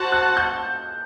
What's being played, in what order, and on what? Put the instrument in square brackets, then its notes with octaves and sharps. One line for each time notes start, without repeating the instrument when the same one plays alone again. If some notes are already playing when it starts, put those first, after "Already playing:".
Already playing: [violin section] F#4 C5 F#5 A5 [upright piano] F#6
[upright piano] F#6
G6